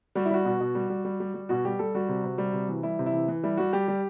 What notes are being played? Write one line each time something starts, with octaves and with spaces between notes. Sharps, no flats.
G3 F#4
E4
G3 F#4
B2
B2
G3
G3
G3
G3
G3
B2 F#4
G3 G4
G3 A4
G3 F#4
C3
C3
G3
C3
E3
G3 E4
C3
E4
E3
E3
G3 E4
G3 F#4
G3 G4
G3